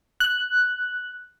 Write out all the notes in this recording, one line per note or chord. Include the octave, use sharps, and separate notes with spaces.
F#6